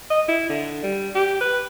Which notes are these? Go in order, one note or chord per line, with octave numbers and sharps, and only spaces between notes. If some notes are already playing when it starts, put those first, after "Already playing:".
D#5
E4
D3
G3
G4
B4